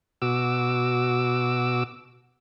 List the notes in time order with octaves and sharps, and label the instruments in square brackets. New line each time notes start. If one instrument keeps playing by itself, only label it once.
[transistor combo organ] B2 F#4 D6 E6